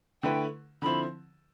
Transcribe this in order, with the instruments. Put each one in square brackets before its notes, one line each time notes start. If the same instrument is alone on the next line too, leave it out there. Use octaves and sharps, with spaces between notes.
[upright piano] D3 A3 E4 B4 [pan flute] G5
[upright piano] D3 F3 C4 E4 [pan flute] B5